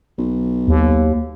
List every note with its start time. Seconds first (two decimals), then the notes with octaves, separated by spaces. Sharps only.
0.18 B1
0.68 D#2